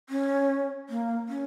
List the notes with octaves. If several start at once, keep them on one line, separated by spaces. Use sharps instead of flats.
C#4
A#3
C#4